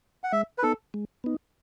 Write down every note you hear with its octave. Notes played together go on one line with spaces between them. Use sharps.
F#5
G#3 E5
B4
B3 D#4 A4
G#3
B3 D#4